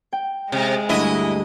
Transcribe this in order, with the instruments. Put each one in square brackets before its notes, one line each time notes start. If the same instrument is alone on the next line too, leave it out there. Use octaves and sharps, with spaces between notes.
[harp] G5
[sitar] C3 [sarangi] G#3
[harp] D2 G2 [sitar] E4 D#5